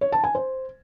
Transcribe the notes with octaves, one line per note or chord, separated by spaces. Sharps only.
C#5
A5
G#5
C5